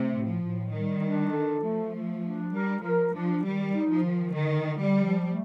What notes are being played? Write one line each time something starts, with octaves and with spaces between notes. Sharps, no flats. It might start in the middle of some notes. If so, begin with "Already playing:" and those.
Already playing: C3 A3
A2
F3
A2
D#3 G3
D4
A4
F3 A3
A3
D4
G3 A#4
F3 A#4
F3 D4
D#3 G3
D#4
F3
D#3
D3 D#3
D3
G3
F3
A3